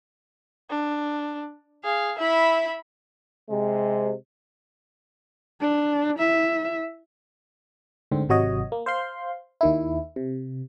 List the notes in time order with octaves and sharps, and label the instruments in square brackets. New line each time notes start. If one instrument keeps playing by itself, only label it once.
[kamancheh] D4
[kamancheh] G#4 [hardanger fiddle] F5
[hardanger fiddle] E4 B5 [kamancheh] E5
[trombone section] C3 G#3
[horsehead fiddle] D4
E4 E5
[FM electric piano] D2 G#2 D3 C4
G#1 C3 F#3 F#4 C#5 D#5
A#3
C5 F5 C6
D#2 D#3 E4
C3